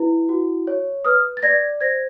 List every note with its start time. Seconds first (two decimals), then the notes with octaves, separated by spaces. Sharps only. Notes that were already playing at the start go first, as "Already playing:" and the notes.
Already playing: E4 B4
0.29 F#4
0.67 C#5
1.05 B4 D#6 F6
1.37 A6
1.43 D5 G#6 A#6
1.81 C5 G#6 A#6